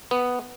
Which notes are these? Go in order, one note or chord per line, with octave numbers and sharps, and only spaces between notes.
B3